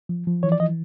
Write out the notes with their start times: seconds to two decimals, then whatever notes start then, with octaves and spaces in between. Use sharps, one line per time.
0.09 F3
0.27 F3
0.43 E3 C#5
0.52 D5
0.60 E3 D#5